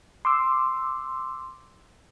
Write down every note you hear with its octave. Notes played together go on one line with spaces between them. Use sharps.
C6 D6 E6